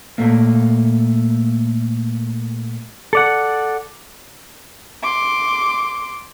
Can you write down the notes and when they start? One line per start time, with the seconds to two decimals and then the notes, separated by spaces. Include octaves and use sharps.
0.18 A#2 A3 A#3
3.13 A4 D5 F#5
5.02 C6 D6